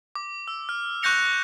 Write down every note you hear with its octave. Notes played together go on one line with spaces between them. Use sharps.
D6
E6
F6
C#6 F#6 G6 A#6 C#7 F7